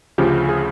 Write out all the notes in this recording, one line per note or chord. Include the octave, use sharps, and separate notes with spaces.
D2 C#3 F3 G4
G#4